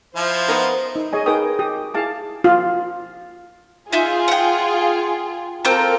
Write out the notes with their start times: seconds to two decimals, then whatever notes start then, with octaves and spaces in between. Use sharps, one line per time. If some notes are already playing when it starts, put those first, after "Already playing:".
0.16 F3 E4 C5
0.48 B3 D#4 A#4
0.96 D#4
1.13 G#4 C#5 D#5 G#5
1.26 D#4 G#4 A#4 B4 G5 D#6
1.59 G4 D#6
1.94 E4 G#4 F5 A5 D6
2.44 F4
3.93 D#4 F4 G#4 E5 G6
4.28 F#5 G5
5.65 A#3 C4 F4 A4 A#4 G6